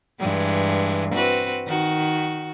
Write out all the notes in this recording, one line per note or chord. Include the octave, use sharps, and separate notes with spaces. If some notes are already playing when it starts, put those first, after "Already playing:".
G2 E3 G#3
C4 F#4 B4
D#3 F#4